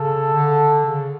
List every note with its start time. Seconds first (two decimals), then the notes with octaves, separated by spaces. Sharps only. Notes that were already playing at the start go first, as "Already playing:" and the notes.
Already playing: C#3 A4
0.34 D3
0.86 C#3